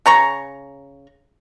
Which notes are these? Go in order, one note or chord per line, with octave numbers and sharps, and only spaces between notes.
C#3 A#5 C#6